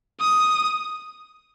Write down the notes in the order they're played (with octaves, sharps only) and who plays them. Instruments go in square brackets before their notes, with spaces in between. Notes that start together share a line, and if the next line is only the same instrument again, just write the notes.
[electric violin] D#6